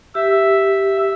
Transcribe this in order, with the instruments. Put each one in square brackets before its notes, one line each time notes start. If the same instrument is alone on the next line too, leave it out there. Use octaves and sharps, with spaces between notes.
[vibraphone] G4 [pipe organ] E5